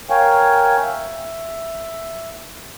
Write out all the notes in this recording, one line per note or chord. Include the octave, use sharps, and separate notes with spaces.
A#4 C#5 F5 G5 G#5
E5